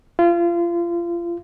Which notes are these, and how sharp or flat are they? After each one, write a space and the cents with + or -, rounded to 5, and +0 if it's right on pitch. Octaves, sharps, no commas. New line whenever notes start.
F4 -30